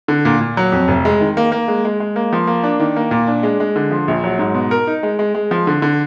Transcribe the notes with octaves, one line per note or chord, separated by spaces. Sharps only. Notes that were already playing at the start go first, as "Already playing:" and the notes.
D3
A#2
A#2
F#3
F2
F1
G#3
D#3
A#3
A#3
G#3
G#3
G#3
A#3
F3
A#3
D4
D#3
A#3
A#2
D4
G#3
G#3
D3
F3
A#1
F#3
G#2
B2
A#4
D#4
G#3
G#3
G#3
F3
D3
D3